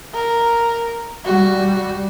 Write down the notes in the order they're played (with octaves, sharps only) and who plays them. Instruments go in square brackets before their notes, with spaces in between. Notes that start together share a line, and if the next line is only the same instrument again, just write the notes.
[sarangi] A#4
[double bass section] G3 [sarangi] F#4